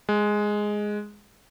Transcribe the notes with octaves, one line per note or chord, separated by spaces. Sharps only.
G#3